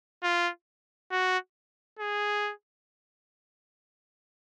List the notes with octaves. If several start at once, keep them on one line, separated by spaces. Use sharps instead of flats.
F4
F#4
G#4